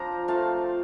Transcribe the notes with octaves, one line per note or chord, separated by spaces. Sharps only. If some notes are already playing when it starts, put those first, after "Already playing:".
Already playing: F3 C4 D4 F4 G5 A#5
A3 C4 F4 F5 A5